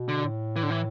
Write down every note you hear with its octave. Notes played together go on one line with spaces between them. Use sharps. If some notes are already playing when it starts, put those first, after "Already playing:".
Already playing: B2
D3
A2
E3
D3
E3